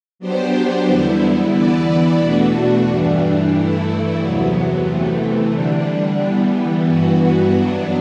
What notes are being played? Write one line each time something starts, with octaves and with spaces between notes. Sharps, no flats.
F#3 B3 D4 G4 C5
E2 D3 G3 B3 E4
E3 B3 E4 B4 D5
E2 B2 A3 D4 F#4
G2 E3 G3 D4
G2 E3 A3 E4
E2 C3 F#3 B3
C3 E3 A3
D3 G3 D4
E3 G3 B3
G2 E3 B3 F#4
F#2 F#3 B3 D4